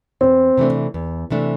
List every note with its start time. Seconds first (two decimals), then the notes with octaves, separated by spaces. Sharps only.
0.21 E2 C4
0.57 C3 E3 A3 D4
0.94 E2
1.30 C3 E3 A3 D4